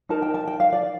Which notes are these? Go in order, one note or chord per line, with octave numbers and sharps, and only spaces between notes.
D#4 A#4 A5
G5
A5
G5
F5
D5